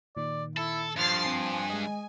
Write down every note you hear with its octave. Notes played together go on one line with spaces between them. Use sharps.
A#2 D#3 D5
E4 A4
G2 F3 F6 A6 C7
C4 G#5
G#3 D#5